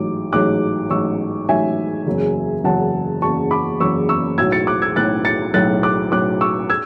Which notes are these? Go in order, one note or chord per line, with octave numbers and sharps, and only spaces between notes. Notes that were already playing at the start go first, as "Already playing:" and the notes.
Already playing: A1 G#2 F#3 D6
A1 G#2 F#3 D6 F#6
A1 G#2 F#3 C#6 E6
A1 G#2 F#3 E5 G#5
F#1 E2 C#3 F#3
F#1 E2 C#3 F#3 F#5 A5
F#1 E2 C#3 F#3 A5 C#6
B5 D6
F#1 E2 C#3 F#3 C#6 E6
C#6 E6
B1 A2 F#3 E6 G#6
A6 C#7
D6 F#6
E6 G#6
B1 A2 F#3 F#6 A6
A6 C#7
B1 A2 F#3 F#6 A6
D6 F#6
B1 A2 F#3 D6 F#6
C#6 E6
E6 G#6